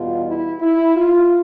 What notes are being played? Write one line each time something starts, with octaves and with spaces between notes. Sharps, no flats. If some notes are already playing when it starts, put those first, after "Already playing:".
Already playing: E2 B2 G3 F4
E4
E4
F4